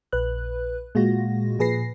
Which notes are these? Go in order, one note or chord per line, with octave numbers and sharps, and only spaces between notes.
A#1 B4 F#6
A#2 G#3 F4 F#4 A#6
A#2 F3 G#4 B4 A#6 C7